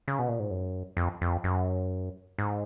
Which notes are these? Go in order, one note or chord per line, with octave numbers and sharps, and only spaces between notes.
C#3
B2
A#2
G#2
F#2
F2
F2
F#2
G#2